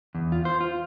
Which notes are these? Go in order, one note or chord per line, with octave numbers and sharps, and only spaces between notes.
E2
F4
C5
F4